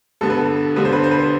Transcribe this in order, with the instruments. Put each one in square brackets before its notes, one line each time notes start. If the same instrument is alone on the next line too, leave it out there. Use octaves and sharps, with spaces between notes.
[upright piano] G2 D3 G3 B3 A4
B4
A4
G2 D3 G3 B3 B4
C5
B4
C5
B4
C5